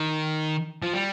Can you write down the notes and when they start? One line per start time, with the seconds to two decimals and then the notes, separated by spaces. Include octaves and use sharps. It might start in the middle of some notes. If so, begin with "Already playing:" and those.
Already playing: D#3
0.83 F3
0.94 G3